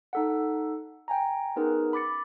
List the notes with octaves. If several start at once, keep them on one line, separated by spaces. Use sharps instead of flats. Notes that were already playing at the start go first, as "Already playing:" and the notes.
D#4 A4 F#5
G5 G#5 A#5
B3 C#4 D#4 G#4 A#4 B4
B5 D6 A6 C#7